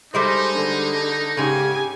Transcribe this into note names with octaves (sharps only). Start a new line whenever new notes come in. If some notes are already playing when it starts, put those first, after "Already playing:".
G3 G#3 D#4 A4 C5
D3
G#2 C#3 G4 G#5